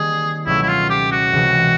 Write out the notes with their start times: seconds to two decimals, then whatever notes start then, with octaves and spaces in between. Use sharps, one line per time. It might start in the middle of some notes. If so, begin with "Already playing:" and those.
Already playing: D#3 G3 A#3 C4 G#4
0.46 C#2 B2 F#3 A3 C#4 E4
0.63 E4
0.68 F4
0.90 G4
1.12 F#4
1.33 C#2 C3 E3 G#3